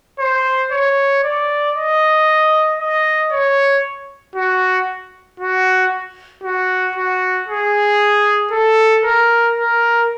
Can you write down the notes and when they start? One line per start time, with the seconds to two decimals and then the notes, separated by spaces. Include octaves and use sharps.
0.19 C5
0.72 C#5
1.23 D5
1.75 D#5
2.80 D#5
3.31 C#5
4.36 F#4
5.40 F#4
6.43 F#4
6.96 F#4
7.48 G#4
8.51 A4
9.04 A#4
9.56 A#4